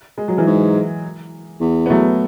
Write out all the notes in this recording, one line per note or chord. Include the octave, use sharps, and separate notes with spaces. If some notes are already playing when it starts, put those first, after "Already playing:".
G#3
F#3
E3 G#3
G#2
E2
B3
F#3 A3